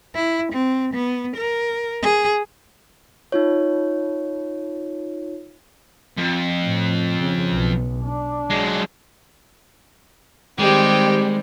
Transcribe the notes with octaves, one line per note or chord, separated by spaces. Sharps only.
E4
C4
B3
A#4
G#4
D#4 F4 C#5
F2
A2
C#3
B1 B3
D4
F#3 G#3
D#3 G3 G#3 C4 G4